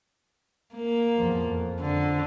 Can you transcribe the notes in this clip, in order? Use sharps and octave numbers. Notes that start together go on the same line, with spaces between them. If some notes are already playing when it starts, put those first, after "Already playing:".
A#3
E2 F3
F2
D3